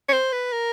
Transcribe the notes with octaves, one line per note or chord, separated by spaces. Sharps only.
C#5
C5
B4
A#4